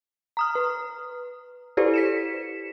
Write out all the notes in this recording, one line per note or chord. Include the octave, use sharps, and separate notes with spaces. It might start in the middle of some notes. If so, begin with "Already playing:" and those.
A#5 D#6 F6
B4
E4 G4 A4 B4 C5 D5
B6 C#7 E7